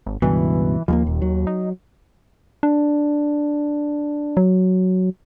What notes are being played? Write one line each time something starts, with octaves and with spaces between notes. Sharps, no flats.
G#1
C#2 G2 B2 E3
D#2 F3 G#3 A#3
D#1
F#3
D#4
D4
F#3